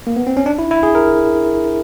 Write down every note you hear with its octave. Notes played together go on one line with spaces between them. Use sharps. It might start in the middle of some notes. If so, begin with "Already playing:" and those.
A#3
B3
C4
C#4
D4
E4
E4
G#4
A#4